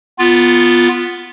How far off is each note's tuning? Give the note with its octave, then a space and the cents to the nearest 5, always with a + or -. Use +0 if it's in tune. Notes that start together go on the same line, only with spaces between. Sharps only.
B3 +0 F4 +0